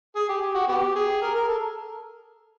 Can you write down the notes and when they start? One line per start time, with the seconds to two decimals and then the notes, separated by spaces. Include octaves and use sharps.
0.16 G#4
0.29 G4
0.41 G4
0.55 F#4
0.68 B3 G4
0.96 G#4
1.22 A#4
1.35 A#4
1.48 A4